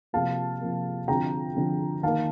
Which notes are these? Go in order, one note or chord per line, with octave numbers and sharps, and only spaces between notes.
C3 F3 A#3 F5 A5
C3 F3 A#3
D3 F3 C4 G5 A#5
D3 F3 C4
D#3 A#3 F5 A5